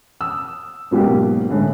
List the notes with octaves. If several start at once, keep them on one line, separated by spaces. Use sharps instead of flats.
D#6 E6
G#2 B2 F#3 A#3 G4
A2 D3 G#3